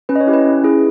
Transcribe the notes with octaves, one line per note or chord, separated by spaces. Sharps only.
C#4 B4
D#5
C#5
E4 G4
B4
C#4
E4 G#4